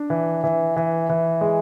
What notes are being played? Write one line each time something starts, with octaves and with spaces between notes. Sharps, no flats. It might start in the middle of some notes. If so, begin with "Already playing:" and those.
Already playing: D4
E3
E3
E3
E3
G#3